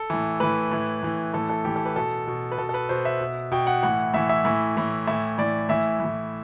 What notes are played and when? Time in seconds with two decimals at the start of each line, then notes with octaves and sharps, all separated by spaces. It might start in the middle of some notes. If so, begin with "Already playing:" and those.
Already playing: A4
0.10 A2 E3
0.40 A2 E3 B4
0.72 A2 E3
1.03 A2 E3
1.33 A2 E3 A4
1.49 A4
1.65 A2 E3 G4
1.76 A4
1.85 B4
1.96 B2 A4
2.27 B2
2.52 B4
2.58 B2 A4
2.69 A4
2.74 B4
2.89 B2 C5
3.05 E5
3.21 B2
3.51 B2 G5
3.67 F#5
3.83 A2 E3 F#5
4.14 A2 E3 E5
4.29 E5
4.45 A2 E3
4.77 A2 E3
5.07 A2 E3 E5
5.38 A2 E3 D5
5.69 A2 E3 E5
6.00 A2 E3